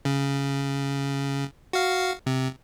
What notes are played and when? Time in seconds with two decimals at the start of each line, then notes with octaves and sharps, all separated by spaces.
0.05 C#3
1.73 F#4 F5
2.26 C3